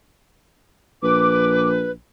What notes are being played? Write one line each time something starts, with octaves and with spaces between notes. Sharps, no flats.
A#1 B4 D6